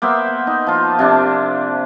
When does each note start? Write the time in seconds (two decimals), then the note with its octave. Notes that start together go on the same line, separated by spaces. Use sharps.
0.02 A#3 B3 C5 E5
0.47 D#4
0.67 F3 F4
0.99 C3 F3 D4